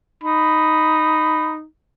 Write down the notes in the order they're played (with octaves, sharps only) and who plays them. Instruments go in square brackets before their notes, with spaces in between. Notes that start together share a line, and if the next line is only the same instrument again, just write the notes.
[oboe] D#4 [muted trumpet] B5